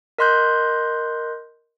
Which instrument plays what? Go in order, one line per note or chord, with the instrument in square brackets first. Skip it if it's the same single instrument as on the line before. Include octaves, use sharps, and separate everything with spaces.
[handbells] A#4 D#5 C6 F#6 G6